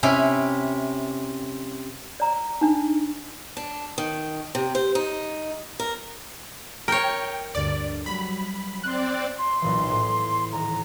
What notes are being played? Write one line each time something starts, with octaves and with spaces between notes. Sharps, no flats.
C3 C#4 E4 E5
D5 A#5
D4 D#4
D4
D#3
C3
C5
D#4
A#4
A#4 C#5 G5
D2 G2 D3 D5
F#3 G3 B5
C4 D5 C6 F#6
C6
B1 A#2 E3
A2
D#1 A#5